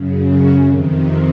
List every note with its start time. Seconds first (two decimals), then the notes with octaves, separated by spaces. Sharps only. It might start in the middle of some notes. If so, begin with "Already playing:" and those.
Already playing: F#2 C#3
0.26 F#4
0.66 F2 C3 D#3